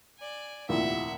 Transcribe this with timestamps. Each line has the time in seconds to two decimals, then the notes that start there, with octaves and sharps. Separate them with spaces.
0.19 D5 G#5
0.69 F1 A#1 D#2 E4 F4 G4 E5 F#5